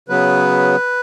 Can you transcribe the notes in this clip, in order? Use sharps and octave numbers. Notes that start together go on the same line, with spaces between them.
C#3 F#3 B3 B4